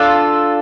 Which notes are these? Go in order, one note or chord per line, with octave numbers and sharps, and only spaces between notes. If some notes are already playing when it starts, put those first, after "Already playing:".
Already playing: D4 F4 A4